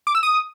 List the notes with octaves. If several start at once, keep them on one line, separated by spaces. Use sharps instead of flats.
D6
E6
D#6